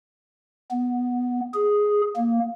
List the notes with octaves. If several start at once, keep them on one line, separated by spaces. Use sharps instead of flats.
B3
G#4
A#3